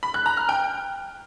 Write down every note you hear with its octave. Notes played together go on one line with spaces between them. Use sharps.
B5
F#6
A#5
F6
G5